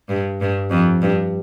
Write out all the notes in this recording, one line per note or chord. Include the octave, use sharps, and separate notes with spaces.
G2
G2
F2
G2